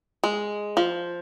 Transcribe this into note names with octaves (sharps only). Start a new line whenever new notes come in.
G#3
F3